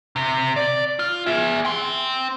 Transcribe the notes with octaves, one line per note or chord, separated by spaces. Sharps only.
C3
D5
F4
G#4 E5
G5 C6